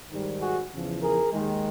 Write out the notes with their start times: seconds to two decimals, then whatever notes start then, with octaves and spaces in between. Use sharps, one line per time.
0.11 G#2 D#3 G3
0.41 F#4 G#4
0.72 E2 C#3 F3
1.03 G#4 A#4
1.33 D#2 D#3 G#3